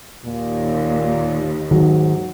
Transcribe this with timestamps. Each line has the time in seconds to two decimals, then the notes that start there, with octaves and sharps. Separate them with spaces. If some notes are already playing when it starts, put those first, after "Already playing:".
0.25 D#2 A#2
1.71 G#2 D#3 F#3